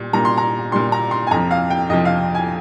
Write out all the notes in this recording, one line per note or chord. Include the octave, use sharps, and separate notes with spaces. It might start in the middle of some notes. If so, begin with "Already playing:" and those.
Already playing: A#2 G3
A#2 G3 A#5
C6
A#5
A#2 G3 C6
A#5
C6
G#5
F2 C3 F3 A#5
F5
G5
F2 C3 F3 D#5
F5
G#5